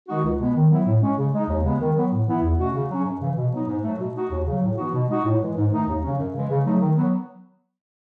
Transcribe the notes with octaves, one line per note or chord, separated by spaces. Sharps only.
D#3 G#3 D#4 F#4
C#2
B2 G#3 B3
D#3
F#3 B3 E4
A2
G#3 C#4
C#3
G#3 D#4
D#2
C#3 G#3 B3
D#3
F#3 B3
A2
E3 B3 E4
E2
B2 A3 C#4 F#4
C#3
F#3 C#4
F#2
C#3 E3
B2
F#3 B3 D#4
G#2
F#3 A3
B2
A3 D#4 F#4
D#2
C#3 F#3
A2
E3 B3 D#4 F#4
B2
G#3 D#4 F#4
A2
E3 G#3
G#2
D#3 A3 D#4
D#2
C#3 F#3 C#4
F#2
C#3 E3 G#3
C#3
F#3 A3 D#4
D#3
F#3 B3